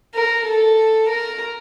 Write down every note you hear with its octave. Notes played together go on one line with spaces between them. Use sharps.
A#4
A4
A#4